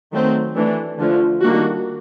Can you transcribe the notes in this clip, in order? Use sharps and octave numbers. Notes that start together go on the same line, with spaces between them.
D#3 F#3 A3 C4
E3 A3 D4
D3 F3 A3
D#3 G3 A#3 D4 F#4